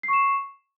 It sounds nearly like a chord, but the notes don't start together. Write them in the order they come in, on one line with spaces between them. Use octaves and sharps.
C7 C#6 E7